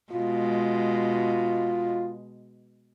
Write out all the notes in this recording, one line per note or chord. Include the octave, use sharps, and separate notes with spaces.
B2 G#3 F4